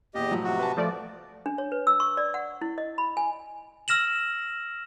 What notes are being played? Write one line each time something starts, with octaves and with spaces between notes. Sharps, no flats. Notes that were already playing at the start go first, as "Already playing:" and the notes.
E2 A#2 G4 D#5
A2 F3 F#3
C3 F#4
B4 A5
F3 A3 D5
D4
C#5
B4
E6
C#6
D5
F#5
E4
D#5
B5
G#5
E6 F6 A#6 E7 F#7